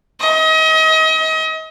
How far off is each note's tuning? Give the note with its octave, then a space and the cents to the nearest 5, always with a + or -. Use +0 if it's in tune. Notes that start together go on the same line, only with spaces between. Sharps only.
D#5 +35